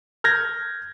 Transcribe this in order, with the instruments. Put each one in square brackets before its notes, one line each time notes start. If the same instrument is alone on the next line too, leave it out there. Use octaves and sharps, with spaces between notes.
[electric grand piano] F6 G6 G#6 A#6